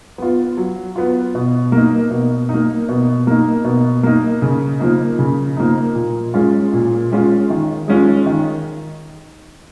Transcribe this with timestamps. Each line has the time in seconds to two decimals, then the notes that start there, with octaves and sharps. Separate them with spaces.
0.18 B3 F4
0.57 F#3
0.96 B3 F4
1.35 B2
1.72 A#3
1.77 D#4
2.11 B2
2.49 A#3 D#4
2.89 B2
3.27 A#3 D#4
3.64 B2
4.03 A#3 D#4
4.42 C#3
4.80 F3 A#3 D#4
5.19 C#3
5.57 F3 A#3 D#4
5.95 A#2
6.34 G#3 C#4 F4
6.73 A#2
7.12 G#3 C#4 F4
7.50 D#3
7.88 G#3 C#4 F4
8.26 D#3